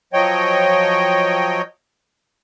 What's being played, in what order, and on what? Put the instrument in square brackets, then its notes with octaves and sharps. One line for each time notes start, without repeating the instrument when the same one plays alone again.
[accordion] F3 F#3 C#5 D#5 G5